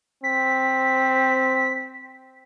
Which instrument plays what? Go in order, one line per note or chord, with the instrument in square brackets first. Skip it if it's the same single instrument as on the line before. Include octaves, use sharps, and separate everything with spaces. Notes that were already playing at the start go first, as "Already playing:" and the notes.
[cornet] C4 [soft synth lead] B6